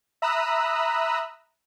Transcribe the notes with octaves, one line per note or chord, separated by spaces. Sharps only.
E5 A#5 B5 D#6 E6 F#6